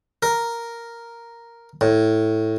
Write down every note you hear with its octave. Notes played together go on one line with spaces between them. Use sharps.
A#4
A2